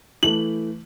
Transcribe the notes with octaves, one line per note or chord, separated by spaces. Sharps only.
E3 A3 F#7